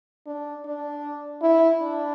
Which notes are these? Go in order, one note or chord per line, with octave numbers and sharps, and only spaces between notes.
D4
D4
E4
D4